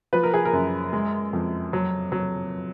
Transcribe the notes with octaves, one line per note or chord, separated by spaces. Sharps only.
F3 B4
A#4
G#4
A#4
F#2
G#3
F2
F#3
F#3